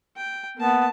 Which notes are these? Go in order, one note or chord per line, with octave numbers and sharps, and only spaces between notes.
G5
A#3 B3 A5